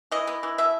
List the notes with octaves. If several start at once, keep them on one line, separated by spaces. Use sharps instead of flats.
E3 D#5
B3
E3
B2 E5